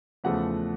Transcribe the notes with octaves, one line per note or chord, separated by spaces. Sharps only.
E2 C#3 F3 A3 F#5